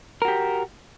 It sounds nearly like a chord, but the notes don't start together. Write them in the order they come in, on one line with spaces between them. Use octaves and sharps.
A#4 F#4 G4